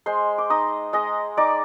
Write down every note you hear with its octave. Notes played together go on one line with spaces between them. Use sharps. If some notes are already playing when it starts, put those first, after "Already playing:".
G#3 C5 C6
D6
D#4 D#5 D#6
G#3 D#5 D#6
D#4 D5 D6